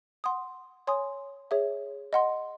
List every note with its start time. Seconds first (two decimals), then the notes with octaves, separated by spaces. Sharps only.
0.24 F#5 C6 D#6
0.87 C#5 G#5 C6 D#6
1.51 G#4 C#5 E5
2.13 D#5 F#5 C6